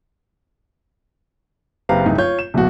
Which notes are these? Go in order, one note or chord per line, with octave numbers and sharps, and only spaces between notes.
F#1 C4 G4 B4 F5 A#5
D1 G2 D#4 E4
F4 C#5 G6
E7
D1 B1 B2 F#4